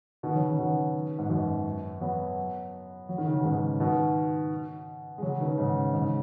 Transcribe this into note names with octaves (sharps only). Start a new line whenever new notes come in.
B2 D#3
C#3 F#3
C#3
B2 D#3
G#2
F#2 B2
F#3 B3
F#3
D#3
C#3 F#3
B2
G#2 C#3
B2 D#3
G#3
C#3 F#3
B2 D#3
G#2 C#3
G#2 C#3